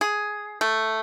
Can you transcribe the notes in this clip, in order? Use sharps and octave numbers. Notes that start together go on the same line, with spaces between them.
G#4
A3